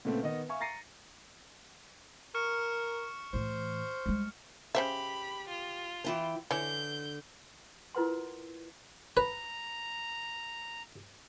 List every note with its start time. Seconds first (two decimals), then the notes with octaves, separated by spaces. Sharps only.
0.05 A#2 C#3 A3 B3 C4
0.23 D#3 B3 D#5
0.49 E5 F5 G#5 C#6
0.60 A#5 A6 A#6 C7 C#7 D#7
2.34 A#4 C#6 F6 C#7
3.33 A2 E3 C5
4.06 G3 G#3
4.75 C#3 G4 C5 E5 B5
5.48 F4
6.04 E3 E4 G5
6.51 D3 E3 E4 C#5 G6
7.95 E4 F4 A#4 B4 F#5 C6
9.17 B4 A#5